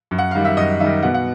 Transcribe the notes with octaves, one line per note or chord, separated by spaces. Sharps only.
F#2
F#5
D#3 G3 F5
E5
F#2 D#5
D#3 G3 E5
B2 F#5
F#5